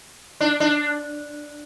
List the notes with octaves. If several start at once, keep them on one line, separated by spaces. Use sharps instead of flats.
D4
D4